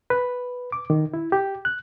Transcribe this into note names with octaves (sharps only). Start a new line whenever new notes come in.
B4
D6
D#3
E4
G4
F#6